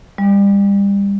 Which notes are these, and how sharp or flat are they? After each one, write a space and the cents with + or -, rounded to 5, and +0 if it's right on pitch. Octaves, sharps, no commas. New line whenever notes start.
G3 +30